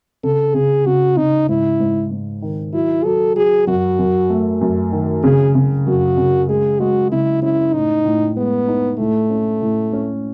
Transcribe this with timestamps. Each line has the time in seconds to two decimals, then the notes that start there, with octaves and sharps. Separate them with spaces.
0.23 C#3 A4
0.54 C#3 G#4
0.86 C#3 F#4
1.17 C#3 D#4
1.49 G#2 E4
1.80 G#2
2.11 G#2
2.42 D#3
2.73 F#3 E4
3.04 F#3 A4
3.36 F#3 G#4
3.67 F#2 F#4
3.99 F#2
4.30 A3
4.61 F#2
4.92 D#3
5.23 C#3 G#4
5.55 C#3
5.86 F#2 F#4
6.17 C#3
6.49 G#3 G#4
6.79 G#3 F#4
7.11 C#3 E4
7.42 C#4 E4
7.74 A2 D#4
8.05 A2
8.37 G#3 B3
8.68 D#4
8.98 A2 A3
9.30 C#4
9.61 A2
9.93 C#4